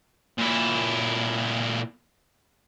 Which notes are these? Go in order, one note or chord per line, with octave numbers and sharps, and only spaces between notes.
A#2 E4